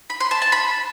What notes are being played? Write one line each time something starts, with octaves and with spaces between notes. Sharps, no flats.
B5
C6
A5
A5
B5